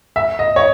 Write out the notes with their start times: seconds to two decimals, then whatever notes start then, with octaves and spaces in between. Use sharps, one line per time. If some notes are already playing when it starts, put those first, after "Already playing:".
0.16 E5
0.39 D#5
0.56 C#5